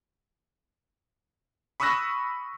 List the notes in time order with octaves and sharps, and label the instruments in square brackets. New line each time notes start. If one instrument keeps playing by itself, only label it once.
[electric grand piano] B5 C#6 D#6 E6 F#6 A#6